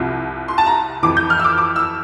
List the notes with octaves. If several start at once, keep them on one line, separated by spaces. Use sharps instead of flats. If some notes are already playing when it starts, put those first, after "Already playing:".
Already playing: C2 C3 F3
C6
A5
A#5
F2 E3 D6
G6
F6
E6
D6
D6
E6